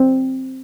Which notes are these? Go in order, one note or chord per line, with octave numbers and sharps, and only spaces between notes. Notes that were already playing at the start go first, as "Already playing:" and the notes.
Already playing: C4